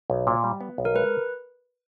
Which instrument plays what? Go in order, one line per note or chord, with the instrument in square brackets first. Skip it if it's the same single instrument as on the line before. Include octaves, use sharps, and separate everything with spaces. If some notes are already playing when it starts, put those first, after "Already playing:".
[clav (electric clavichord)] B1
A#2
G3
B3
B1
[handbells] A#4
[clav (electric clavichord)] G#3 [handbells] B4